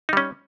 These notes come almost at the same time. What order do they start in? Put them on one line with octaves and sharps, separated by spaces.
D#4 G3 C#4